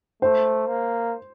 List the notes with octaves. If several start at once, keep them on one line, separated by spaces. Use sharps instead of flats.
A3 C5
A#3